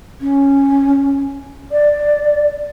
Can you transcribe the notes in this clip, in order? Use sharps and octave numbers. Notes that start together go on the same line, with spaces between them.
C#4
D5